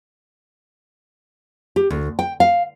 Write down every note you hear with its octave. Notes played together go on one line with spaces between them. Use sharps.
G4
D2
G5
F5